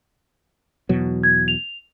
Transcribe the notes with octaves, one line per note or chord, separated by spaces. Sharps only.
E2 B2 F#3
G#6
F7